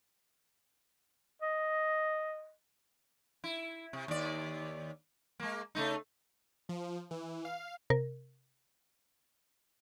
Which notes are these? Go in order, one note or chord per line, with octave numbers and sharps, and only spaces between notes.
D#5
E4
C3
D#2 D5
G#3 A#3
C#3 A3 D#4
F3
E3
F5
C3 A#4